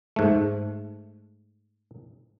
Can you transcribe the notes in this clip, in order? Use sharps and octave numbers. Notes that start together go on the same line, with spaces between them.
G#2 A3